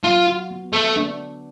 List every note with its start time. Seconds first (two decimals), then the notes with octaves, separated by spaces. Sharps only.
0.03 F#3 F4
0.27 F#4
0.51 B3
0.73 A3 B3
0.96 D4